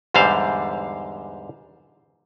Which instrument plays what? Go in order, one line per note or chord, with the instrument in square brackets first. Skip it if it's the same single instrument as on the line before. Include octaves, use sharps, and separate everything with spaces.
[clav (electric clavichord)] E2 G#2 D3 G3 C5 F5